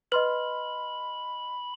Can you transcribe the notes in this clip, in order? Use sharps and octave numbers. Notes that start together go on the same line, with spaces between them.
B4 D#5 B5 C6 F6